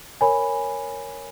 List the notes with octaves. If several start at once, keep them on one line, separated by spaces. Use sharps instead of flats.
A#4 C#5 G#5 B5